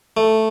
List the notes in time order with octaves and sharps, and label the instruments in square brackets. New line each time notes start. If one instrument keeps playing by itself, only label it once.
[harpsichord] A3